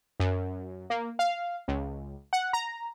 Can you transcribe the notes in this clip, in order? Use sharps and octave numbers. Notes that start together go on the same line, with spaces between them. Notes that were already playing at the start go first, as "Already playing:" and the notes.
F#2
A#3
F5
C#2
F#5
A#5